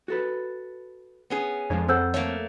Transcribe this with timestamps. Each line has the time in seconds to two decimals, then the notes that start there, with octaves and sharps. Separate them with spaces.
0.08 F#4 A4 B4
1.30 B3 C#4 G#4
1.70 F2 F3 G#3 D4 C#5
1.88 C4 A4 C5 F#5 E6 G6
2.14 A3 A#3 C#5 F6